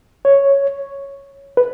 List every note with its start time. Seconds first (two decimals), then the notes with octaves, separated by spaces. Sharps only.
0.25 C#5
1.57 B4